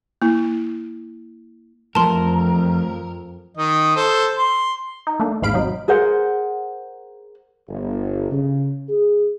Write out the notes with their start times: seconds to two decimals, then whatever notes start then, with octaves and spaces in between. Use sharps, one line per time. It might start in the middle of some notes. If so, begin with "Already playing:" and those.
0.22 A#3 E4
1.95 F2 E3 F3 A3 A#4 A5 C6
3.57 D#3 D#5
3.96 A4 C5
4.38 C6
5.07 D#4
5.20 A3 A#3 D4
5.42 A1 E2 G#2 F5 B5 D7
5.54 C3 F#3 D#4
5.88 G#4 A#4 C5 F#5
7.68 G1
8.30 C#3
8.89 G#4